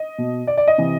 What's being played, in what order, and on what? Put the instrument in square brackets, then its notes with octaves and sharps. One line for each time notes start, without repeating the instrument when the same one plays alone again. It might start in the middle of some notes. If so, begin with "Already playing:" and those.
Already playing: [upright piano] D#5
B2
D5
D5
D#5
C3 E3